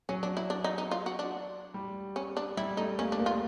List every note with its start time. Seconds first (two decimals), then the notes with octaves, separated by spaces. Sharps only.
0.09 F#3 C#4
0.23 D4
0.37 E4
0.50 D4
0.64 D#4
0.78 D#4
0.91 F4
1.06 F#4
1.19 D4
1.74 G3
2.16 C#4
2.37 D4
2.57 G3 E4
2.77 A3 D#4
2.99 A#3 C#4
3.12 D4
3.19 A#3
3.26 F4